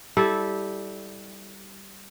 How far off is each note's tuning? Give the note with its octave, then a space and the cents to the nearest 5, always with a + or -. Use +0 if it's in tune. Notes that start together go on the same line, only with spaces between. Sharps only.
G3 +0 E4 -15 A4 -10